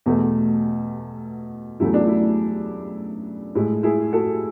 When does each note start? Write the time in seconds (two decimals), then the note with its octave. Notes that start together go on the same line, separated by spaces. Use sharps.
0.06 E2 B2 A3
1.80 E2 C#3 F#3 A3 E4
1.94 D4
2.07 E4
3.55 A2 G#3 E4
3.83 E4 G#4
4.13 F#4 A4